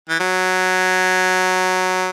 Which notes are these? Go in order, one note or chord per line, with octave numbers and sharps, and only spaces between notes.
E3
F#3